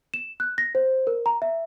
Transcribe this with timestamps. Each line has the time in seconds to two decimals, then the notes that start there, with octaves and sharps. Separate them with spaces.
0.14 E7
0.40 F#6
0.58 A#6
0.75 C5
1.07 A#4
1.26 A#5
1.42 E5